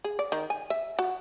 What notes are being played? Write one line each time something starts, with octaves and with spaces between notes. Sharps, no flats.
G#4
D5
D#3
G#5
E5
F#4